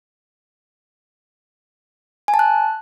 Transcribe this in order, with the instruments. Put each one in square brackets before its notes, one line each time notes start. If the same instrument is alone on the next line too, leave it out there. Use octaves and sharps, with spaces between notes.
[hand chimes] G#5
A5
F#6